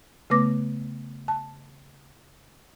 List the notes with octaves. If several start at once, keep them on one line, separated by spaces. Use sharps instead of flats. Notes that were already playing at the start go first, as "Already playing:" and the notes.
C#3 A3 B3 B4 D6 A#6
A5